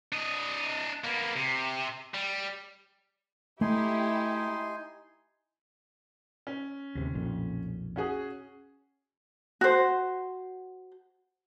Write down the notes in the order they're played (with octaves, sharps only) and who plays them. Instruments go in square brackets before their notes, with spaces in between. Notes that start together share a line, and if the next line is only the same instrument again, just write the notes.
[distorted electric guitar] D4 D#5
A#3 B3
C3
G3
[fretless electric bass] A3 [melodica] D#4 G#5 C6 [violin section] E4 G4
[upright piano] C#4
[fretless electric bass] D#2 C3
B1 F2 A#2
[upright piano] C#4 F#4 G#4
[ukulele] F#4 C5